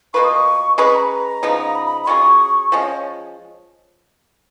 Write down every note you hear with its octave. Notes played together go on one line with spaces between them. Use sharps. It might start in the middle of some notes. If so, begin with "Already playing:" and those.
B2 A#3 F4 B4 C#6
D#6
C#6
G#3 C#4 G#4 B4 C#6
B5
A#5
C#3 F3 B3 D#4
B5
B5
B5
F#3 C#4 F4 G#4 C#6
F3 G#3 C#4 G#5
C#5